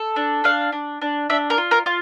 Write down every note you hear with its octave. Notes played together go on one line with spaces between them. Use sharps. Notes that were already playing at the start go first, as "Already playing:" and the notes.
Already playing: A4
D4
D4 F5
D4
D4
D4 E5
A#4
F4
A#4
F4